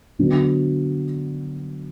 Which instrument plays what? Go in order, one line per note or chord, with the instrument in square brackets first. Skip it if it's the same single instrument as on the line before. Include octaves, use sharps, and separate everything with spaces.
[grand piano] D3 F#3 B3 D4 F#4